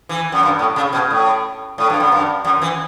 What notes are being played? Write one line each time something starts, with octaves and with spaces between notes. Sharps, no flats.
E3
F#2
G2
A2
C#3
B2
A2
A2
G2
F#2
G2
F#2
E3